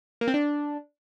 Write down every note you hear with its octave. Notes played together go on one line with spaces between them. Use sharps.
A#3
C4
D4